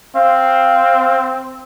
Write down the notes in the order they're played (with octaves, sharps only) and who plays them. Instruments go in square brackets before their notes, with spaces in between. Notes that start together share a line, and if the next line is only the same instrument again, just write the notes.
[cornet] C4 [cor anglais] F5